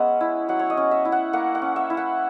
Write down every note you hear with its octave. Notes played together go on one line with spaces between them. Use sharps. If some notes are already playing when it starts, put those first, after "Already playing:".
Already playing: G#3 B3 C#4 E5 F#5
E4
F#3 F#5
C#5
D#5
C#4
E5
E4
F#5
A#3 F#5
F#5
C#4
E5
E4
F#5